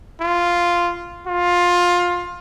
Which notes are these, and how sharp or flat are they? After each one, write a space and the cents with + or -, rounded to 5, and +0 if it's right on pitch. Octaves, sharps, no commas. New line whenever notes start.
F4 -5
F4 +15